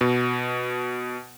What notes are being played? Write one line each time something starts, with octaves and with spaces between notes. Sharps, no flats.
B2